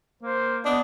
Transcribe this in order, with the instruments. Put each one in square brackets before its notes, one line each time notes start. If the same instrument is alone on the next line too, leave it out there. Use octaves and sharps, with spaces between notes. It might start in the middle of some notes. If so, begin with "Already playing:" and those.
[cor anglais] A#3 [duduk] C5
[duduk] B3 [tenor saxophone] D4 [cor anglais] D#5